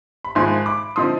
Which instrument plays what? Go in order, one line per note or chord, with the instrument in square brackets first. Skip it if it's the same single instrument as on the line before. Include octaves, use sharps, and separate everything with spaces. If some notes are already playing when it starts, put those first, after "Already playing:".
[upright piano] B5
G#1 G#2 F3 G#3 G#5 C6
B5 D6
D3 F3 C4 D#4 C6 D#6